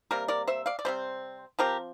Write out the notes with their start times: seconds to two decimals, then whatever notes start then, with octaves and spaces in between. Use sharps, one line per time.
0.11 C3 G3 A#3 A#4
0.28 A#4 D5
0.48 C5 E5
0.66 D5 F5
0.79 D5
0.85 C3 G3 C4 C5
1.59 F3 C4 G4 A#4